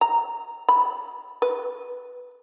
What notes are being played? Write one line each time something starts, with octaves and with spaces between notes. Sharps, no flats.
A#5
B5
B4